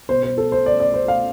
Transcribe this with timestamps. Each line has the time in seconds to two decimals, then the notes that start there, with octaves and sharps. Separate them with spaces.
0.09 B2 C5
0.23 C5
0.38 A4
0.52 C5
0.66 D5
0.80 D5
0.94 C5
1.08 F5